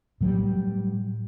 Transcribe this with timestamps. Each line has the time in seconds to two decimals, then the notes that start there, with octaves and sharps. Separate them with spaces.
0.21 A2 F#3 G3